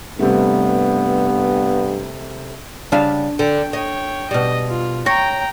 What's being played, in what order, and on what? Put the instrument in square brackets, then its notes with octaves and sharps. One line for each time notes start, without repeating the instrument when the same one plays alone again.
[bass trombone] G2 [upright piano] C3 G3 A3 [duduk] B3
[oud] C#3 G3 F5 [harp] D4 E7
[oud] D3 [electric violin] G5
[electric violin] C#5 G5 [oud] D#5
[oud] B2 G3 [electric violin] D#5
[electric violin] F4
[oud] C#5 [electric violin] G5 A#5 [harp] A#6